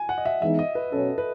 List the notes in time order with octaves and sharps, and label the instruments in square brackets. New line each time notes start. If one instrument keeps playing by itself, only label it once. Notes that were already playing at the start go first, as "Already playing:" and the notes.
Already playing: [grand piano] G#5
F#5
D#5
E5
[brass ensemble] E3 G#3 B3 D#4 [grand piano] E5
[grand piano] D#5
B4
[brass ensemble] B2 F#3 C#4 [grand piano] A4
[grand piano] B4